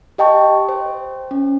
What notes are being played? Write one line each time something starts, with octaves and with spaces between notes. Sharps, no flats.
G4 D#5 G5 A5 C#6
C5
C#4